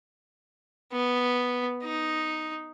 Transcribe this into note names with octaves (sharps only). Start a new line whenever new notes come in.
B3
D#4